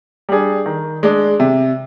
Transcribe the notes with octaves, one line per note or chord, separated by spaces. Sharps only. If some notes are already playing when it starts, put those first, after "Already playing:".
G3 D4 G#4
D#3
G#3 D4
C3